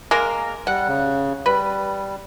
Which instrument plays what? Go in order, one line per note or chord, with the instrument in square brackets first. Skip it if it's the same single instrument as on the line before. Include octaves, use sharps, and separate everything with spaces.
[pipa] G#3 A#3 A#4
[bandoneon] G3 [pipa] F#5
[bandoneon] C#3
[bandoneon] G3 [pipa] B4